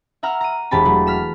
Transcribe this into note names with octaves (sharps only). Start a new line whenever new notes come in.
E5 F#5 A#5 F6
A#5 D#7
E1 G4 A5 B5
F#3 A3
F6 B6 E7